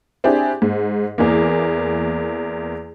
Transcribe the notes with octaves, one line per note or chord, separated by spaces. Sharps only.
C4 D4 E4 G4 G#4
G#2
E2 E3 A#3